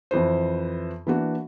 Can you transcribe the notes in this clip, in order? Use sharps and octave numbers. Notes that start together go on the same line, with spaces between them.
F2 E3 B4 C5
E3 A#3 D4 F#4